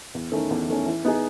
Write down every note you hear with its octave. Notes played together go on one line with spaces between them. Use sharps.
E2
D#3 A3 C#4
E2
D#3 A3 C#4
E3
B3 D#4 G#4